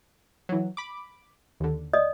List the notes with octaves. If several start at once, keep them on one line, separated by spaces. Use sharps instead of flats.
E3 F#3
B5 D6
D#2 D3
D5 D#5 D#6